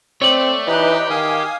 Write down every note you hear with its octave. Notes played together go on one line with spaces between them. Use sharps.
A3 C4 C#5 D5
E3 D#4 G4 B4
D#3 F5 G#5 D#6